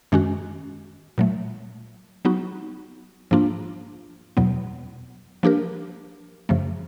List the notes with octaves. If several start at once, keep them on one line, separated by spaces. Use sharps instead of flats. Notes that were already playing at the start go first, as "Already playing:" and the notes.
F#2 D#3 G#3 C#4 F#4
A#2 F#3 A3
F#3 B3 D#4 F#4
G#2 F3 A#3 D4 F4
E2 B2 F#3 B3
F3 A#3 D4 G4 A#4
F#2 C#3 F3 A3